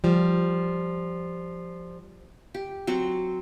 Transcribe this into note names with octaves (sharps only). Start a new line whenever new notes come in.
F3 G3
G4
F#3 C4 C#6